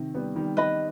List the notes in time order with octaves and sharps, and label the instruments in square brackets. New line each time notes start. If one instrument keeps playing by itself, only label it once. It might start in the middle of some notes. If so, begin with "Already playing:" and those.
Already playing: [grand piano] C3 D#3
G3 B3
D#3 G3
[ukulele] B4 D#5 B5